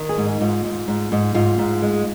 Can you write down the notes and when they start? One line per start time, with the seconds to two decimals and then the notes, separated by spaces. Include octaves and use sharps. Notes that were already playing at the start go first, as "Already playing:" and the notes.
Already playing: D#3
0.09 G#4
0.18 G#2
0.26 D#4
0.41 G#2 F4
0.65 G#2
0.88 G#2
1.12 G#2
1.34 G#2 F4
1.59 G#2
1.82 G#3